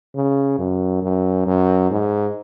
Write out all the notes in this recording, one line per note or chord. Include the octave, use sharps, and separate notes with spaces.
C#3
F#2
F#2
F#2
G#2